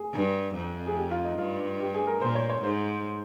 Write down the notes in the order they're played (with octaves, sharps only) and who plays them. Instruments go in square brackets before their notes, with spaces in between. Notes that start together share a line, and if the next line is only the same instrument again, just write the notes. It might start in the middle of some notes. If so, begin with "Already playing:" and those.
Already playing: [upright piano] G#4
[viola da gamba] G2
F2
[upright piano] G#4
G4
F4
D#4
[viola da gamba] G2 [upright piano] F4
[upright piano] G4
G#4
A#4
[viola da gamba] A#2 [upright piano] C5
[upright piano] C#5
C#5
[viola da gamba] G#2 [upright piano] C5